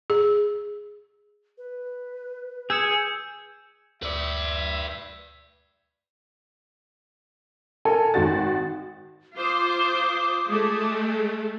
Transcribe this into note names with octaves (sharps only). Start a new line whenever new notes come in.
G#4
B4
G#4 E6 G6 G#6 C#7
D2 B4 D5 E5
A4 A#4 G#5
G#1 D#3 F#4 A6
F4 C5 D6 D#6
G#3 A3